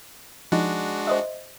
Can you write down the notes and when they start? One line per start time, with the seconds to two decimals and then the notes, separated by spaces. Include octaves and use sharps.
0.52 F3 G#3 D4 D#4 F#4
1.07 C5 D#5 E5